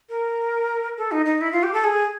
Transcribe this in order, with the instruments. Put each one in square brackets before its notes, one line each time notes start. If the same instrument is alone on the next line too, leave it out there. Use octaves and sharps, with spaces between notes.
[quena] A#4
A4
D#4
D#4
E4
F4
G4
A4
G#4